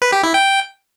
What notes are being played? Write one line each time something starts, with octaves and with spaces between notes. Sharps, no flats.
B4
G4
E4
G5